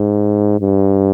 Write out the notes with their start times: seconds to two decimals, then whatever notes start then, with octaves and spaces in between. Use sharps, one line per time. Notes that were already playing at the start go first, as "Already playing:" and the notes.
Already playing: G#2
0.60 G2